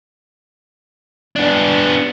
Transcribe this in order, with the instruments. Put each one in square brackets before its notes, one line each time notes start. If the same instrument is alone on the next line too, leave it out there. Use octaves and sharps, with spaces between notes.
[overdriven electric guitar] B3 D4